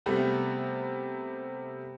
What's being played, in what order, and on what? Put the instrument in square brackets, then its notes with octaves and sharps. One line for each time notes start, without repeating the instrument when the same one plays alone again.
[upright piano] C3 G3 A3 B3